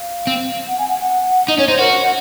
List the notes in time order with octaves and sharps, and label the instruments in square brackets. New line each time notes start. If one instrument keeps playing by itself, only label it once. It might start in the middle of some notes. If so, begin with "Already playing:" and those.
Already playing: [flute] F5
[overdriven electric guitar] C4
[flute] F#5
G#5
F#5
F#5
[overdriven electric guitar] D#4 [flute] D#5
[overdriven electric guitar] C#4 [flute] C#5
[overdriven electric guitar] D#4 [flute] C5
[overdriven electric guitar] F#4 [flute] A#4
[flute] F#5